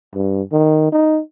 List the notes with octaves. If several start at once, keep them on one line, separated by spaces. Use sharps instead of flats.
G2
D#3
D#4